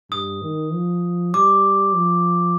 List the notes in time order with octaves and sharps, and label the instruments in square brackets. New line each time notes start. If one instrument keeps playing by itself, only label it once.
[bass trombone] G2 [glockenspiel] D#6
[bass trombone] D#3
F3
[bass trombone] G3 [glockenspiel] D6
[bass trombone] F3